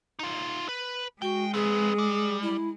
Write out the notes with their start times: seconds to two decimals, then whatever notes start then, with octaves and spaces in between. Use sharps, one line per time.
0.19 D#4 F4
0.69 B4
1.22 G#3 F#4 G5
1.54 C4 G#4 B4
1.98 G3
2.42 E4